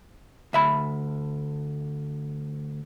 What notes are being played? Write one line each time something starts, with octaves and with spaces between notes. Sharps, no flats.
D2 E5 B5